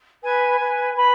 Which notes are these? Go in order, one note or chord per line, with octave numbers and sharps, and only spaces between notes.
B4 G#5
B4
B4 B5